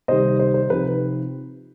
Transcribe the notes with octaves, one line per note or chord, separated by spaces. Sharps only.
C3 D#3 G3 C5 D#5
C5
C5
C3 F3 C4 D#4 B4